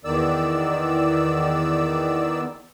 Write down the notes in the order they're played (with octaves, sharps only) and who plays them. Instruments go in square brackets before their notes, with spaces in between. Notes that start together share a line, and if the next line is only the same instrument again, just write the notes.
[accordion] E2 D#3 D5 E6